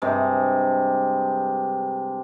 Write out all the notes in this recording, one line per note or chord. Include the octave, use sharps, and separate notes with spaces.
G2 C3 G#3